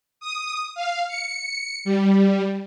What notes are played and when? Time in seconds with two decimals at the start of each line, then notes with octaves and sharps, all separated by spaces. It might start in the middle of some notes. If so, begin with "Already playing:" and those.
0.20 D#6
0.75 F5
1.08 C#7
1.85 G3